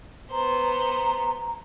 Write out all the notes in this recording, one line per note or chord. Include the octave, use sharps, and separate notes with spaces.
B3 C5 A#5